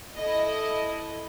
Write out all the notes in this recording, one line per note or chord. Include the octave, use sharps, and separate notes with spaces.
E4 A4 D#5